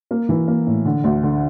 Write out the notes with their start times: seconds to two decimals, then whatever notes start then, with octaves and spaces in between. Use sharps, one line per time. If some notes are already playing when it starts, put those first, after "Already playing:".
0.11 A#3
0.29 E3
0.48 A#3
0.67 A2
0.85 D3
1.04 D2
1.23 D3